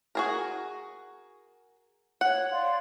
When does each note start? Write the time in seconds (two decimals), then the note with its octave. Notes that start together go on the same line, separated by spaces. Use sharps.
0.15 F#4 G#4 A#4
2.21 C#5 F#5
2.51 D5 F5 C6